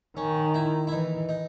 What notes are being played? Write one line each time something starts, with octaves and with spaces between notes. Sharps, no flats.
D#3 C#4
E4
E4
E3 D#4
D#4